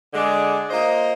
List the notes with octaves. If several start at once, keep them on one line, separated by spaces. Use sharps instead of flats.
D3 G#3 D4 G#4 D5
A#3 F4 C5 D#5